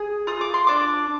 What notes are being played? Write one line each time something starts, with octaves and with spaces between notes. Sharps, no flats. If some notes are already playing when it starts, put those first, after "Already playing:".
Already playing: G#4
F4 D#6
D6
C6
D4 D6